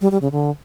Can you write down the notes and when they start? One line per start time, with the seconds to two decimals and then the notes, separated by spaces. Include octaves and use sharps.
0.01 G3
0.11 G3
0.22 C#3
0.32 D3